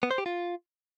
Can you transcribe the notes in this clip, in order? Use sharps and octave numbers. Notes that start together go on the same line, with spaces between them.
B3
C5
G4
F4